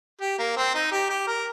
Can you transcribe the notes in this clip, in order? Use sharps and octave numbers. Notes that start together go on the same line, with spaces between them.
G4
A#3
C4
D#4
G4
G4
A#4